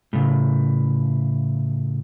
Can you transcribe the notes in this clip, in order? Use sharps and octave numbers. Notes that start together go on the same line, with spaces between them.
A2 C#3